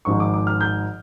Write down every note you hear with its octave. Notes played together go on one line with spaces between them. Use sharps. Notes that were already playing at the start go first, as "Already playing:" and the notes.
G#1 G#2 F3 G#3 C#6
D6
D6
F6
G6